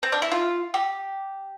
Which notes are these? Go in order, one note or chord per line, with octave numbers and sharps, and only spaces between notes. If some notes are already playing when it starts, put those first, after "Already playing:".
C4
D4
E4
F4
G4